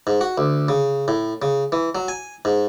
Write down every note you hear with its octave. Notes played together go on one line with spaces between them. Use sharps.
G#2
F#4
D2
C#3
A2
C#3
E3
F#3
G#5
G#2